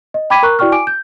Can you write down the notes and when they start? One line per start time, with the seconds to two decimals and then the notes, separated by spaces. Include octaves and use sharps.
0.14 D#5
0.30 G5 B5 D6 G#6 B6 D#7
0.43 A#4 A#5 C#6 F#6
0.59 E4 F#4 D5 G5 C#6 F6
0.72 G#5 D6 D7
0.87 G6